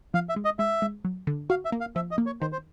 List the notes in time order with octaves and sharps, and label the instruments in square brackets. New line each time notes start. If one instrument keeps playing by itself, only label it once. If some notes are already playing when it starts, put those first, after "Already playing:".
[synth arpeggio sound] F3 [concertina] F5
[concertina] E5
[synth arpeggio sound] G#3
[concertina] D#5
[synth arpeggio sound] G#3 [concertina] E5
[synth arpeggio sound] G#3
F#3
D3
[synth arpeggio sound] F#4 [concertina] F5
[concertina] E5
[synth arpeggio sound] A#3
[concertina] F5
[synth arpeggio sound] F3 [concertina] E5
[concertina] D#5
[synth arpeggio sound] A#3
[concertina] C#5
[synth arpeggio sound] D#3 [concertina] C5
[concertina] C5